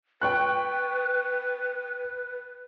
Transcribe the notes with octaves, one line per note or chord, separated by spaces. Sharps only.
B4 G5 C#6 F#6